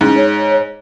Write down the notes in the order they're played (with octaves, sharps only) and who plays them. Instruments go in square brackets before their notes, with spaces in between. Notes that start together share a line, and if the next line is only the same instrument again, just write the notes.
[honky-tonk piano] G#2 [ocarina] C#4
[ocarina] C#5